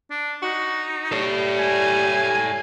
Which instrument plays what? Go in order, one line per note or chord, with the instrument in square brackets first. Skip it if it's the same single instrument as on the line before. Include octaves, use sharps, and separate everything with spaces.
[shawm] D4
[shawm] D#4 [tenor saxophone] F#4
[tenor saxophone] G3 [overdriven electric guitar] A4 C#5
[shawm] G#5